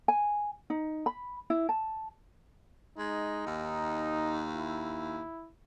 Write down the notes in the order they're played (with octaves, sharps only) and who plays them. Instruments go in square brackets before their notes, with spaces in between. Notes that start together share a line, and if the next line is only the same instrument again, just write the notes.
[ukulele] G#5
D#4
B5
E4
A5
[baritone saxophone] G#3 [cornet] D#4
[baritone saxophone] D#2
[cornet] E4